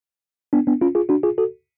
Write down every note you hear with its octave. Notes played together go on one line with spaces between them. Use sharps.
B3 D4
B3 D4
C#4 F4
F4 G#4
D4 F#4
F4 G#4
F#4 A4